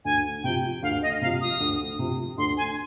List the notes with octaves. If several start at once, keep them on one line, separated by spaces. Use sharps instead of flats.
D2 G#5
C3 F3 G5
D2 F5
D#5
C3 F3 F5
D#6
D2
C3 F3
D2 C6
G#5